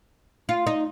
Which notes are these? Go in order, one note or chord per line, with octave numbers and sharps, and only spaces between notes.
F4
D#4